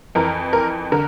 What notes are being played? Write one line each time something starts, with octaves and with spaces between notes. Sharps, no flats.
F2 E3 A#4
A#4
D3 A#4